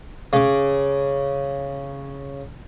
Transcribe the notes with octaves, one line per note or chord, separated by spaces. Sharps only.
C#3 D6